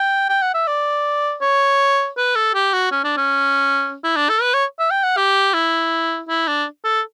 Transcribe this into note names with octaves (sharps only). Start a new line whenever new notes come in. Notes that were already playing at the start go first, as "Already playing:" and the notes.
Already playing: G5
G5
F#5
E5
D5
C#5
B4
A4
G4
F#4
C#4
D4
C#4
E4
D4
A4
B4
C#5
E5
G5
F#5
G4
E4
E4
D4
A4